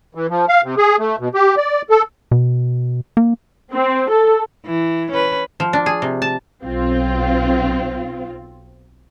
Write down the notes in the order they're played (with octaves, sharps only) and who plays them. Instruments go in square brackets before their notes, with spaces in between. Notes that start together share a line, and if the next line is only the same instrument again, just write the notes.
[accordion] E3
F3
F5
C3
G#4
A3
B2
G4
D5
A4
[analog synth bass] B2
A#3
[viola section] C4
A4
[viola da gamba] E3
C#4 B4
[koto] F3
D4
G#4
C3
A5
[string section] B1 C4 F4